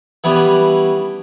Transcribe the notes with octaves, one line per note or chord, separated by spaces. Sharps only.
E3 G3 B3 C#4 D4